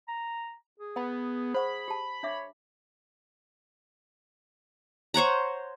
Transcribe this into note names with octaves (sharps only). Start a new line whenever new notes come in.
A#5
G#4
B3 F#5 B5
C5 F#5 B5 C#6
G4 A5
D4 C#5 E5 D6
C5 C#5 F#5 A#5